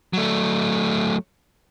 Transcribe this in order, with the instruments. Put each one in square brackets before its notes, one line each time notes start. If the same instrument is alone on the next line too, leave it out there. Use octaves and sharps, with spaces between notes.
[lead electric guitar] F#3 A3